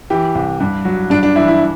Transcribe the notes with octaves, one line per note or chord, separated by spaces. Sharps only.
E3 G4
C2
G2
F#3
G2 D4
D4
E3 E4
E4